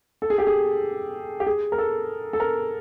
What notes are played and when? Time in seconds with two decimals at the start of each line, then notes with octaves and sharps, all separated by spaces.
0.22 A4
0.30 G#4
0.38 G4
0.47 G#4
1.40 G4
1.47 G#4
1.72 A#4
1.78 A4
2.33 A4
2.40 A#4